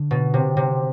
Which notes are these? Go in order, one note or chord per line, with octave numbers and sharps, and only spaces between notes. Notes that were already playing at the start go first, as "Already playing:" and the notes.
Already playing: D3
B2
C3
C3